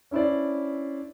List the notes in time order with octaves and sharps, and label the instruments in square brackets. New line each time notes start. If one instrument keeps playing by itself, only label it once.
[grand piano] C#4 D4 E4 C5 D5